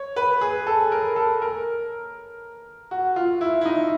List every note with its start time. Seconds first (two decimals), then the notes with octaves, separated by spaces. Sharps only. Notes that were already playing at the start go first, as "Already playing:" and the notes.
Already playing: C#5
0.16 B4
0.41 G#4
0.67 A4
0.92 A#4
1.16 A4
1.42 A#4
2.91 F#4
3.16 F4
3.41 E4
3.61 E4
3.65 D#4